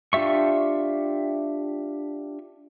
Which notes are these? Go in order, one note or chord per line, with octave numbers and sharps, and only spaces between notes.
D4 F4 G4 E5 C#6